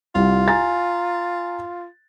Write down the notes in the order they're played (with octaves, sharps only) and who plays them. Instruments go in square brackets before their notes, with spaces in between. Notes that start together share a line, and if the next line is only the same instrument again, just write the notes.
[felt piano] C2 [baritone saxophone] F4
[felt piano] G#5 A#5 A6